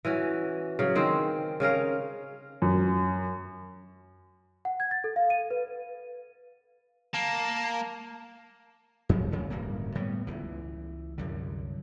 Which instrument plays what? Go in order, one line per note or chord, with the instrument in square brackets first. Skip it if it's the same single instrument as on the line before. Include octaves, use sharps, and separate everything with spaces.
[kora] E3 C#4 F#4
C#3 F#3
D#3 C4 G#4 C5
C#3 C#4 A#4 F5
[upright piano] F#2
[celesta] F#5
G#6
A6
A4
F5
D#7
B4
[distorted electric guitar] A#3 [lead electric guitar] A5
[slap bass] E2 C#3 F3
D2 C#3
D1 G2 C#3 A#3
A2 G3 B3
C#2 E3
C2 F#2 D3